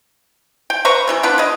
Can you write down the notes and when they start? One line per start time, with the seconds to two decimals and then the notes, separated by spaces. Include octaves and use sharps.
0.70 G5
0.85 B4 C5 A#5 C#6
1.07 C3 E3 G3
1.23 B3 D4 F4 B4
1.38 G#3 D#5